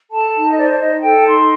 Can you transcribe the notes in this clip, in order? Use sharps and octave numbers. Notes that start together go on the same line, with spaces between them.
A4 A5
D#4
D#5
C5 D5
D5
D#4 D#5
A4 G5
D#4 C6